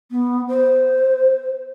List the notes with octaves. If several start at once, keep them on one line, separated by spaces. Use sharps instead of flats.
B3
C5